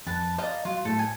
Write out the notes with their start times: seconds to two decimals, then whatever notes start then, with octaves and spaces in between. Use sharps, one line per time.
0.07 F2 B4 A5
0.38 C5 D5 D#5 F5 A#5
0.65 F#3 F4
0.85 A2 A3 A4
0.99 G#5